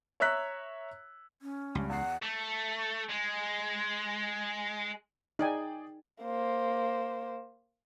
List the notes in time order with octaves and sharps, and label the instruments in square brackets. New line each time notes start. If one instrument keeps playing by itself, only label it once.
[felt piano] C#5 E5 A#5 E6 F#6 B6
[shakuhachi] C#4
[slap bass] C#2 [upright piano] G2
[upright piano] E2 C7 [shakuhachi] F#5
[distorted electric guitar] A3
G#3
[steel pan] D#4 G#5 [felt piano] G#4 D5 G5
[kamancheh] A#3 C5